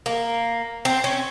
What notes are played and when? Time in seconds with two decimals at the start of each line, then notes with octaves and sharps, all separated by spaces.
0.06 A#3
0.85 C4
1.04 C#4